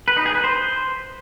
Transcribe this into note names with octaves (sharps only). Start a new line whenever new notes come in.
B4
D#4
G#4
B4
C5